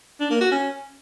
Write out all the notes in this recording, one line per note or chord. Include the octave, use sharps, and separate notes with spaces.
D4
A#3
F#4
C#4